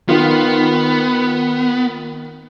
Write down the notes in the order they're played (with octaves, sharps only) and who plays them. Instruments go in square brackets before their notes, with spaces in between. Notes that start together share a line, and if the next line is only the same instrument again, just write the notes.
[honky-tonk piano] D#3 F4 [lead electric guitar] B3